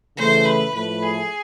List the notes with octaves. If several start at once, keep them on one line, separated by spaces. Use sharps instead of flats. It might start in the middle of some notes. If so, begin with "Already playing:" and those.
C#3 E3 A3 C5
B4
A2 F3 A3 B4
G#4